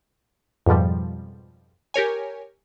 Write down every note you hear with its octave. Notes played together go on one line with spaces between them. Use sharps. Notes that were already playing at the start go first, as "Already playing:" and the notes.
F2 G#2 B2 F3 G3
G4 A#4 C#5 G#5